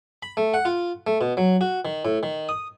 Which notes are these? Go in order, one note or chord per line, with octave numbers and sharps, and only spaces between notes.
B5
A3
F#5
F4
A3
B2
F#3
F#4
D#3
A2
D#3
D#6